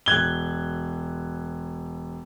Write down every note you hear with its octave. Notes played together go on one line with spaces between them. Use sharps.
E1 F#6 G#6 G7